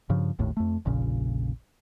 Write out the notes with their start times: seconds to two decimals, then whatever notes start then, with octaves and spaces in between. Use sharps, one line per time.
0.10 G2 C#3 F3
0.39 G#1 D#2 A2
0.57 F2 A3
0.85 F1 A#1 A#2 C#3